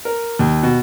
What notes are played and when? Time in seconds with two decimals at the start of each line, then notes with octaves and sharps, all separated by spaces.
0.05 A#4
0.39 D#2
0.63 B2